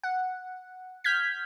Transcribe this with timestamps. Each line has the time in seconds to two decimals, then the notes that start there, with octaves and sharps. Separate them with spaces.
0.03 F#5
1.04 F6 G6 G#6 B6